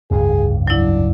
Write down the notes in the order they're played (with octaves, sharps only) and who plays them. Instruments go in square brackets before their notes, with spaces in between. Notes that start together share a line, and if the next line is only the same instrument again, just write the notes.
[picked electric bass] F1 C#2 G2 [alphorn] G#4
[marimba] F#3 E4 [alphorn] D4